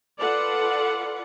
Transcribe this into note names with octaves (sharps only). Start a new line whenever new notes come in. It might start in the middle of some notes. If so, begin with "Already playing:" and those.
F4 A4 B4 D5 F#5